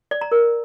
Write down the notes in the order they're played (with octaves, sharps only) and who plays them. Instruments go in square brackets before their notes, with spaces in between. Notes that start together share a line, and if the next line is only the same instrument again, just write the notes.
[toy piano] D5
A#5
A#4